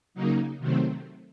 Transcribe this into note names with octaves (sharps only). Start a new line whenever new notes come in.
C#3 F#3 A#3 D#4
C3 D#3 F#3 A3 C4